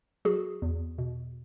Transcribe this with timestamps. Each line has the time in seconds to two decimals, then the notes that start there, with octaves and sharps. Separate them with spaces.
0.25 F#3 F#4 G#4
0.62 E2
0.98 B2